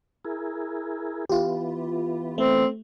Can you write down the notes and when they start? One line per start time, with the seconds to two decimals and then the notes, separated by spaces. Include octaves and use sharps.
0.25 E4 G#4 A#4
1.30 E3 B3 F4 G4
2.38 A3 C4